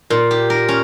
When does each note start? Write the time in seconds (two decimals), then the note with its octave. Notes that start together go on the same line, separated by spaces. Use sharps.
0.10 A#2
0.31 G4
0.50 A#4
0.69 C#4